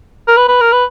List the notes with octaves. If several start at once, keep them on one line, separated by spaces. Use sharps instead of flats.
A#4
B4
B4
A#4
B4